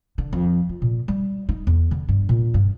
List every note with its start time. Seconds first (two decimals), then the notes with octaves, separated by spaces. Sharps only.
0.18 D3
0.33 F2
0.69 F4
0.82 A#2
1.08 G3
1.49 D#4
1.67 E2
1.91 D3
2.08 G2
2.29 A#2
2.54 G2